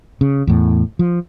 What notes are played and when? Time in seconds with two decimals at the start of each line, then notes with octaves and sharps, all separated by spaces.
0.21 C#3
0.47 E2 A2
0.99 F3